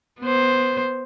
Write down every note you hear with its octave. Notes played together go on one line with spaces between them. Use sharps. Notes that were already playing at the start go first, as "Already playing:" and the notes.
B3 C5